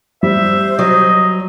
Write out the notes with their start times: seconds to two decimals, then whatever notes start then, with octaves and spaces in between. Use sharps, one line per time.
0.23 G3 C5 E5
0.79 F#3 D#5